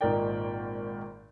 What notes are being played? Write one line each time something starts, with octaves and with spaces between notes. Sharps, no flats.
G#1 A#2 D#4 A#4 D5 G5